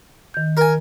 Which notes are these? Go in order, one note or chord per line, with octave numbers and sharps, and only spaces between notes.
D#3 G6
A#4 G#5